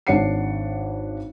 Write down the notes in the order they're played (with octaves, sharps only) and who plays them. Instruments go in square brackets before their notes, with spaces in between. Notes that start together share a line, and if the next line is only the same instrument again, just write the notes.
[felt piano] G#1 D4 C#5 F#5 C7 C#7